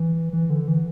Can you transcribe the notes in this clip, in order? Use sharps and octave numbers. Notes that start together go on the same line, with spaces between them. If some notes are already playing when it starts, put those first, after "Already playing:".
Already playing: E3
E3
D3
E3